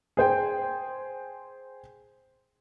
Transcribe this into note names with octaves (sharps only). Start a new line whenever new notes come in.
G#4 C5 G5